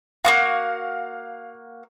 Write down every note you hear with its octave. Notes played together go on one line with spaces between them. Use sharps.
A#3 B3 F#4 F5